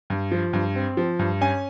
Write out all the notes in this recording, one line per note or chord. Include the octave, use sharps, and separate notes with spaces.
G2
F3
G2
C4
F3
G2
C#4 G#5